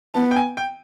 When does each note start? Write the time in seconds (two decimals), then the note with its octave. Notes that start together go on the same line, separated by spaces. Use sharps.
0.14 B3 A5
0.31 G5
0.36 G#5
0.57 G5